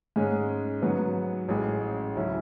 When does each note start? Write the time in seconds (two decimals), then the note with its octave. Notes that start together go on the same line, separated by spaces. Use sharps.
0.16 G#2 G#3 C#4
0.82 G#2 F#3 B3
1.48 A1 A2 G#3 C#4
2.15 D2 C#3 F#3 C#4 E4